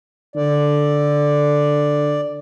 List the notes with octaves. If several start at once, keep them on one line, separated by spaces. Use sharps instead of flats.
D3 D5